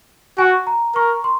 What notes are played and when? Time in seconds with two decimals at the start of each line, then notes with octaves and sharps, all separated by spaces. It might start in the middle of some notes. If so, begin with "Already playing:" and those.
0.38 F#4 G#5
0.67 A#5
0.95 A#4 C#6
1.24 C6